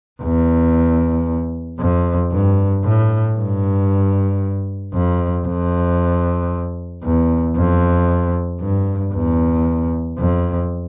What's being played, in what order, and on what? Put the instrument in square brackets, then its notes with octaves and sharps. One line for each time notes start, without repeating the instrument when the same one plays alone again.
[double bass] E2
F2
G2
A2
G2
F2
F2
E2
F2
G2
E2
F2